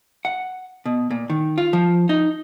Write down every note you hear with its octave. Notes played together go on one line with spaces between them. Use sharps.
F#5
B2
A#2
D#3
F4
F3
D#4